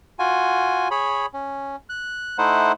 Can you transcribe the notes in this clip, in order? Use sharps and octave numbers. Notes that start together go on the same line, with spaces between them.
F4 F#4 G#5
G#4 C#5 B5
C#4
F#6
A3 D#4 E4 C5 F#5